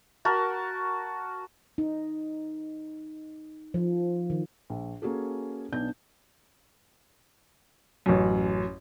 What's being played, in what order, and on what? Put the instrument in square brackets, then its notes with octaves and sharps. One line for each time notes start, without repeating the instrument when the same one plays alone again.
[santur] F#4 A#4 A5
[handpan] D#4
F3
D#3
[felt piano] A#1
A#3 C#4 F#4 G#4 A4
B1 B3 D4 G6
A1 F#2